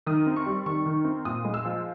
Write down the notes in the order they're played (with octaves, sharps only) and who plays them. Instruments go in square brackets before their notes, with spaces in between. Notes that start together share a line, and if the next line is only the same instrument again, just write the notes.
[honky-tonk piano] D#3 D#6
C4
C#6
G3
D#3 C#6
D#3
C4
A#2 D#6
G#3
E6
F3